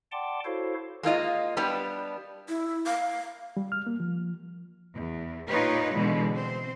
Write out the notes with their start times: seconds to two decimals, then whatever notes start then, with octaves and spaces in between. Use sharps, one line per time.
0.12 D5 F#5 G5 A5 C6 D6
0.45 E4 F#4 A4 C5 C#5 F5
1.03 G#3 A#3 F4 D#5
1.57 G3 B3 D4 G4 B4
2.48 E4
2.86 F5
3.57 G3
3.72 F6
3.87 A#3
4.00 F3
4.94 E2
5.48 A#2 D#4 F4 G4 B4 C#5
5.94 B2 D3 E3 G#3
6.32 C4 C5